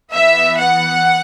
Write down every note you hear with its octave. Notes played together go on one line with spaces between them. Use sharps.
E3 B3 E5
F#5